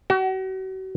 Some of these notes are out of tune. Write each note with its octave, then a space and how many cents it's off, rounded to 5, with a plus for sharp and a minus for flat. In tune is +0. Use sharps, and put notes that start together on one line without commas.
F#4 +40